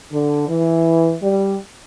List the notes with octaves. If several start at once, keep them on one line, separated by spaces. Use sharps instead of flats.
D3
E3
G3